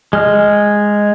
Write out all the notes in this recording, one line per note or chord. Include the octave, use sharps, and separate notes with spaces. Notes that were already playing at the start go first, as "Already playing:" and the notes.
G#3 F6